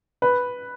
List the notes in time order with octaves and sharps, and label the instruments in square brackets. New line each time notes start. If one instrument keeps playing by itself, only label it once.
[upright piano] B4